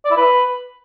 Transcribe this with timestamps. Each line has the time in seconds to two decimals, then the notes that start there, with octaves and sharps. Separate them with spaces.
0.05 D5
0.11 E4
0.17 B4